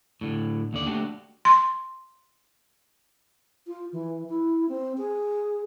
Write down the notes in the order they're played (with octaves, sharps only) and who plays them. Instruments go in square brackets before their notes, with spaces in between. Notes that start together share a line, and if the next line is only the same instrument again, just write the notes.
[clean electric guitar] A2 D3
D#2 D3 D5
A3 D4 F#4 G4
[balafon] C6
[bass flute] F4
E3
E4
C4
G#4